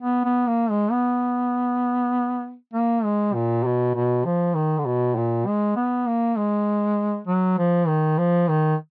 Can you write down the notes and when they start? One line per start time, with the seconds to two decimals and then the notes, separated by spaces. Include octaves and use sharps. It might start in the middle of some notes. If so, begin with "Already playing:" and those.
0.02 B3
0.24 B3
0.47 A#3
0.70 G#3
0.92 B3
2.74 A#3
3.04 G#3
3.34 A#2
3.64 B2
3.95 B2
4.25 F3
4.55 D#3
4.78 D3
4.86 B2
5.16 A#2
5.46 G#3
5.76 B3
6.06 A#3
6.37 G#3
7.27 F#3
7.58 F3
7.87 D#3
8.18 F3
8.48 D#3